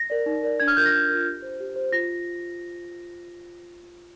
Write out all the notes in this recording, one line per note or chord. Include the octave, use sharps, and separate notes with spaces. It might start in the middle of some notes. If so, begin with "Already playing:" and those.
Already playing: A#6
A#4 D5
D#4
A#4 D5
D4 G#6
F6
F4 A#4 G6
A#6
D4
A#4
F4
G4
C5
G4
C5
F4 A#6